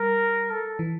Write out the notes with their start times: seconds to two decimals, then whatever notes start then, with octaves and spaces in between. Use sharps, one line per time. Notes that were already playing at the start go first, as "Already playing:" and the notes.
Already playing: G3 A#4
0.50 A4
0.79 E3